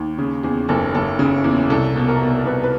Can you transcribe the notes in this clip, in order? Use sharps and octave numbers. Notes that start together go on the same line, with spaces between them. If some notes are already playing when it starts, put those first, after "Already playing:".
Already playing: D#2
C#3
E2 G#4
F#1 A4
F#1 A4
C#3
E2
C2 A4
B2
A#4
B2
C2 B4
B4